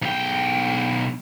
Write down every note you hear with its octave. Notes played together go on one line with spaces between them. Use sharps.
B1 G5